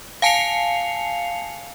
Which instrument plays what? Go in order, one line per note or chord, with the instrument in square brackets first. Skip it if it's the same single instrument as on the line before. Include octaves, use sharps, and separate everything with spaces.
[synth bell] F5 G#5 A5 C7 C#7 F7